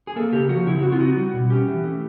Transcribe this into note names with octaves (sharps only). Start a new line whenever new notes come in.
G#4
A#3 A4
C#3 G4
F3 F#4
C#3 E4
C4 F#4
F4
D#4 F#4
G3
B2
C#4 G4
E3
A3